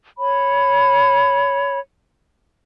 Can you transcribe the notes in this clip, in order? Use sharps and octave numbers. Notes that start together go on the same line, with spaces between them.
C#5 B5